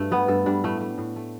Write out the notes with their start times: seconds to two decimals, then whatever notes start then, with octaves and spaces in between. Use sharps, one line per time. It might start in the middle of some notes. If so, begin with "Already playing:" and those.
Already playing: G2 A3
0.11 G3 B3
0.28 G2 A4
0.46 G3 D4
0.64 A2 A3
0.81 A3
0.98 A2
1.16 A3